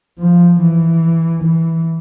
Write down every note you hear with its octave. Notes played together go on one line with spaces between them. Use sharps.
F3
E3
E3